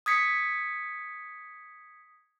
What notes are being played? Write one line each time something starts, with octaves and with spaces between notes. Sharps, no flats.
D#6 G#6 B6 C#7